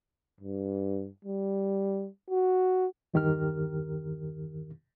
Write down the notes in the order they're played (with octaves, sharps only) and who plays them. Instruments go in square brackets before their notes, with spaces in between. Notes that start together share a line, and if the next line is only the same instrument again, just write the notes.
[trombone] G2
G3
F#4
[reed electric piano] E2 G2 D#3 G4 A#4 F6